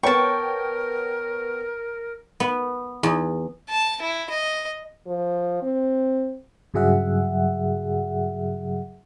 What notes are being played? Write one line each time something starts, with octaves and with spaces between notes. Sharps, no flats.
B3 A#4 C#5 G5 A5 C#6
B3
E2
A5
E4
D#5
F3
C4
G2 C#3 F#3 G#4 E5 F#5